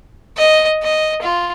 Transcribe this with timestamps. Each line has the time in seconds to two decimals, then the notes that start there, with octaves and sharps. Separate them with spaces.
0.37 D#5
0.83 D#5
1.22 F4